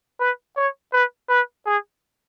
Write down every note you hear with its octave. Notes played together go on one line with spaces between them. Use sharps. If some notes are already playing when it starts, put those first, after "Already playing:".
B4
C#5
B4
B4
G#4